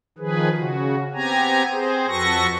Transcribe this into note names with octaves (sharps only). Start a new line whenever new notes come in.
D#3 F3 G#4 B4
C#3 F#4
B3 C4 G4 G#5 A#5
C4 G#4 C5
F2 F#4 A4 B4 C#6 A#6